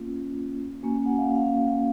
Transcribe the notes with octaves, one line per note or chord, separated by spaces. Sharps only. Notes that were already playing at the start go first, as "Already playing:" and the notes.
Already playing: A#3 C#4 F4
A#3 C#4 F#4 G#5
G#5
F#5
F5
F5